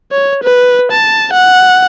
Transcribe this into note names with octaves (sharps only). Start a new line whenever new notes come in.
C#5
B4
A5
F#5